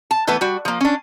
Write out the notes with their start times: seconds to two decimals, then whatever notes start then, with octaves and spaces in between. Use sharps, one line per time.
0.11 A5
0.27 E3 A3 B3 B4
0.41 G3 F#4
0.65 F3 A#3
0.81 C#4 D4